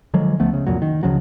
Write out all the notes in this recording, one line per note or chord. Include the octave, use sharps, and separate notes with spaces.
D3 F3 F#3 G#3
C#2 F3 A3 B3
C#3
C2 F2 A#2 F#3
D#3
C#2 C#3 F3 F#3